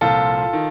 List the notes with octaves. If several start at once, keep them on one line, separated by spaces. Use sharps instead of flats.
C2 A#2 F3 F4 A4
D#3